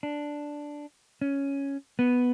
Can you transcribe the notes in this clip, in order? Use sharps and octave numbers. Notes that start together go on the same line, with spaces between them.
D4
C#4
B3